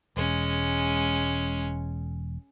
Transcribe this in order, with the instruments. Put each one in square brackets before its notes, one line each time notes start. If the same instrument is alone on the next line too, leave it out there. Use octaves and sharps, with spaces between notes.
[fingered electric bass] E1 [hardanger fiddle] G#3 C#4